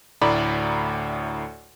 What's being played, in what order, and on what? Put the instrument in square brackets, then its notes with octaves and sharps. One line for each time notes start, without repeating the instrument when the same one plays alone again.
[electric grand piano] D2 A2 D5 A#5 B5